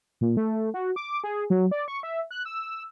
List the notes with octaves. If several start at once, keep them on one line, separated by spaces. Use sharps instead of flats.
A#2
A3
F#4
D6
G#4
F#3
D5
C#6
E5
F#6
E6